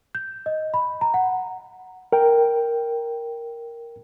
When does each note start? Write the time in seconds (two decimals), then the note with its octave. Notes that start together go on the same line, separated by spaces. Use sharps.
0.15 G6
0.46 D#5
0.74 B5
1.01 A#5
1.14 F#5
2.13 A#4 G5